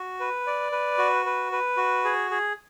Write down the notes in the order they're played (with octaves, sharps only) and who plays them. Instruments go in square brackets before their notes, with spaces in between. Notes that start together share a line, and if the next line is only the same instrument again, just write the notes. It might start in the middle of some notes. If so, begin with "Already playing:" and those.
Already playing: [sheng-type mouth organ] F#4
B4
D5
B4
F#4
B4
B4
F#4
G#4
G#4